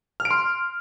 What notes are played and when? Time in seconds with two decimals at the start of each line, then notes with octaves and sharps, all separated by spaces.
0.20 F6
0.25 D7
0.31 C6